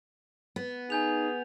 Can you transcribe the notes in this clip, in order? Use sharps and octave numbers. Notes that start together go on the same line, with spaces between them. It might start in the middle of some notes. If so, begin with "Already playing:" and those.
B3
D#4 G#4 G#5 G6 F7